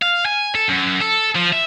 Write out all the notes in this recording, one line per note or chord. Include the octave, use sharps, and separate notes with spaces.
F5
G#5
A4
F#2
A4
F3
E5